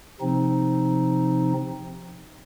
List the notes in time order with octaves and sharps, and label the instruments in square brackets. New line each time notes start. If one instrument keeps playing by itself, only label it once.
[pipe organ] C3 F3 C4 D#4